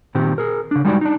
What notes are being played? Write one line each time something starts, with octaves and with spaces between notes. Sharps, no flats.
A#2 D#3 C4 G4
G#4 A#4
C#3 D4
G3 G#3 D#4 F#4 G4 D5
D4 D#4